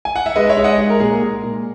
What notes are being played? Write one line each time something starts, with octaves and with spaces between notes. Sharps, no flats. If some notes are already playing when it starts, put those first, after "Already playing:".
G#5
F#5
E5
G#3 B4 D#5
C#5 E5
G#3
D#5 F#5
G#3
A#4
A#2 G#4
A#4
G#3
A#2